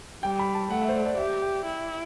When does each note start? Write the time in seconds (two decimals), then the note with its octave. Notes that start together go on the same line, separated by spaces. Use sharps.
0.23 G3 G5
0.39 B5
0.54 A5
0.70 A3 F#5
0.82 E5
0.89 C5
0.95 D5
1.06 D5
1.17 G4 E5
1.42 G5
1.65 E4